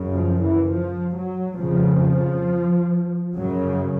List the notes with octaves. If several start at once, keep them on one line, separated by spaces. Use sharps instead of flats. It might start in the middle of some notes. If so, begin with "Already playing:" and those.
Already playing: F#2 C#3
F3
E3
F3
F#3
F2 C#3 F3
F#2 C#3 F#3